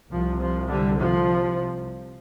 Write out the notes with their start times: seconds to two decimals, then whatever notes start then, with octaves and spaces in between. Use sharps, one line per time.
0.11 C2 C3 F3
0.41 F3
0.69 D3 G3
0.98 F3